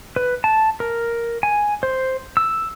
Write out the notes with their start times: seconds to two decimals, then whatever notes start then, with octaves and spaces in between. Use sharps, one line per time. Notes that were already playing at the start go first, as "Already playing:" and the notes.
0.16 B4
0.44 A5
0.80 A#4
1.43 G#5
1.83 C5
2.37 E6